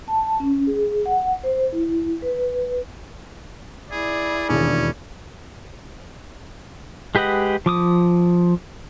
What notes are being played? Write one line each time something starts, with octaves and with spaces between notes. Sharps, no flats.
A5
C#4
G#4
F#5
C5
E4
B4
E4 G#4 D5
E1 D#2 C#4 D4 G#4
G#3 G4 B4 D#5 F#5
F3 D6 D#6